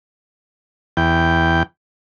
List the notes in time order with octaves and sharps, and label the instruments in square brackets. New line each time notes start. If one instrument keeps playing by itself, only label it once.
[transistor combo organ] E2 G5